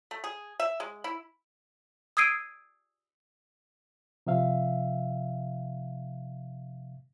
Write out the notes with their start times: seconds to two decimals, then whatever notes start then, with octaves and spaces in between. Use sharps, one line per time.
0.11 A3
0.24 G#4
0.60 E5
0.80 G#3
1.04 E4
2.17 D#6 E6 G#6 C7 D7 D#7
4.27 C3 F3 E5 F5